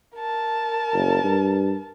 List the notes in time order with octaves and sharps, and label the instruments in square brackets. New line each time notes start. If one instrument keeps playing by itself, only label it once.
[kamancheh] A#4 A5
[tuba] F#1
G2